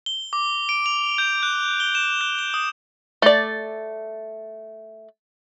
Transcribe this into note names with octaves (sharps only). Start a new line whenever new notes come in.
G7
D6
D7
F7
G6
F#6
G7
E7
F#6
G7
D#6
A3 D5